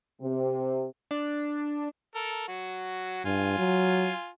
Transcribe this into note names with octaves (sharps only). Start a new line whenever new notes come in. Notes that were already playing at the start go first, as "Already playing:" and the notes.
C3
D4
A4 A#4
F#3 F#4
G2 F4 G#5
F#3